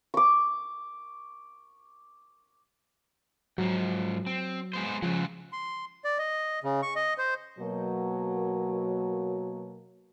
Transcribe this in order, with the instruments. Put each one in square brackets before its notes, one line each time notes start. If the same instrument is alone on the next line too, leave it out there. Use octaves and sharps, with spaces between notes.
[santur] C#6 D6
[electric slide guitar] G#2 F3 [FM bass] F#3
[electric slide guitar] C4
G#3 B3 C5
[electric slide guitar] C#3 F#3 G#3 [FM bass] F3
[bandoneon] C6
D5
D#5
C#3
C#6
D#5
C5
[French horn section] B2 F#3 A#3